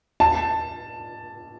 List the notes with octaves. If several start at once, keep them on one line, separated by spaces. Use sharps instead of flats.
A5